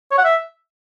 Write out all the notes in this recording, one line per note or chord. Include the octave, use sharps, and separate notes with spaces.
C#5
F#5
E5